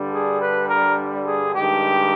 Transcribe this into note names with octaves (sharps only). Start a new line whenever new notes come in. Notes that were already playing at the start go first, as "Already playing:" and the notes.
Already playing: G2 D3 G3
G#4
B4
A#4
G#4
G2 D#3 G#3 G4